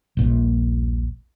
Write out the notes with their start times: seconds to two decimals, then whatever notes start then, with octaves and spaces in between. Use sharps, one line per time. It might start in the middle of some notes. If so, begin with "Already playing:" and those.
0.17 D#1 A#1 A#2